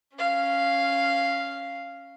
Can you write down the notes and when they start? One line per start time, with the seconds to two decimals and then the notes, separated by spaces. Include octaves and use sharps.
0.16 C#4 F5